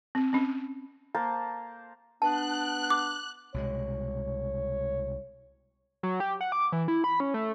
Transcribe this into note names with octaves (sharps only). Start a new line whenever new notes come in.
C4
C4 C#4
A#3 A#4 C5 A5
B3 D4 A5 F#6
D6
C2 B2 G#3 C#5
F#3
G4
F#5
D6
E3
E4
B5
C#4
A3